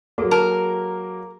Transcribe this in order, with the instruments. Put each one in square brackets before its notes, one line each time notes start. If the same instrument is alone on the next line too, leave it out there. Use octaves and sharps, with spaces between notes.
[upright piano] F#3 A#3 [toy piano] F#4 G#4 A4
[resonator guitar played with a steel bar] A#4 [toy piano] A5 A#5 D6